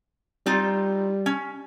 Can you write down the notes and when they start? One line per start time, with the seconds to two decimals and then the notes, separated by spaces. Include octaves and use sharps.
0.46 G3 C4 D#4 F4
1.26 C#4